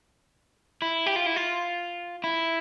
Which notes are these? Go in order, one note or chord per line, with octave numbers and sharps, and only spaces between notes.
E4
G4
F4
E4
F4
E4